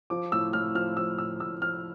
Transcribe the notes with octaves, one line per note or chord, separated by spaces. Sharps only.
F3 D6
A2 E6
A2 F6
F3 F6
F3 E6
A2 E6
A2 E6
F3 F6